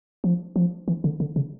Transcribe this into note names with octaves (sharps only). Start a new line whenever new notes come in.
F3
F3
E3
D3
D3
C#3